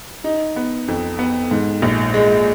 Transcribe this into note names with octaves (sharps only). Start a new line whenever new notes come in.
D#4
B3
F2
B3
G#2
A#1
G#3